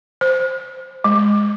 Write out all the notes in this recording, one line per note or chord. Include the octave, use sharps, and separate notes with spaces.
C5
G#3